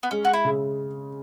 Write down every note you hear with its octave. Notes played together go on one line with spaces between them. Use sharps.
B3
G#3 C#4
F#4
E4
C#3